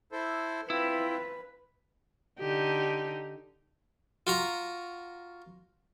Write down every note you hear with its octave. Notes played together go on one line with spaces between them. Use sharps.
E4 A4 C5
C4 E4 F4 B4
D3 D#4 G4
F4 F#4 A#5